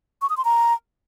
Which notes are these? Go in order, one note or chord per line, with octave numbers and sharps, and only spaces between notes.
C#6
D#6
C6
A#5